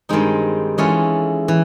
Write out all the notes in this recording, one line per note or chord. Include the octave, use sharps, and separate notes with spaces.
G2 D#3 G#3 C4 D#4
E3 G#3 C#4 F4 A4
E3